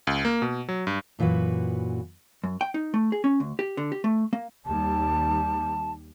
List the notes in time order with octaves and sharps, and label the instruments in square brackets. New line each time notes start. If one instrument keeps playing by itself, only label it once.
[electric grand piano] C#2
A#3
B2
F#3
G2
[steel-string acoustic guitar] F#2 A#2 E3 F#4 B4
[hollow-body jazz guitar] F#2
G5
D#4
A3
G#4
C#4
D2
G4
D3
G4
A3
A#3
[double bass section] D#2 G3 [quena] A5